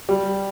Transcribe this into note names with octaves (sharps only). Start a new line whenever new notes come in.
G3